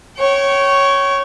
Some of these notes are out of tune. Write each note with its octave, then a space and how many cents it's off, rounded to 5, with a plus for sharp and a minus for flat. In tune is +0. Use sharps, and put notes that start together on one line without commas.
C#5 +0 G5 -35